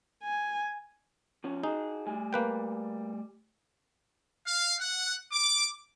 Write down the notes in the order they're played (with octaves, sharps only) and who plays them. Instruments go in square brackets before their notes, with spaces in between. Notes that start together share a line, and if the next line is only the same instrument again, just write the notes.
[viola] G#5
[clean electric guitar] F3 C#4
[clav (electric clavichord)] D#4 [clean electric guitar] F#4 G#4
[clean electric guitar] G3 A3 G#5
[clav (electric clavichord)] A#3 B4 G5
[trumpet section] F5
F#5
D6